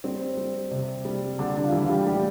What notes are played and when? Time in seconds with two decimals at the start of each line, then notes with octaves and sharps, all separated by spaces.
0.04 G3 C4
0.37 G3
0.71 C3
1.05 G3
1.39 D3 G3 D4
1.55 D3 D4
1.64 F4
1.72 E3 G3 E4
1.83 F4
1.89 G3 G4
2.06 A2 G3 G4